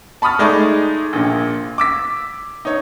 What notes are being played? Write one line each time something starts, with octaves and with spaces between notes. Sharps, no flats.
A5 B5 C#6 D#6 F6 A6
G#3 A3 D#4 G#4 D5
A#1 A#2
D6 E6 B6
D#4 C#5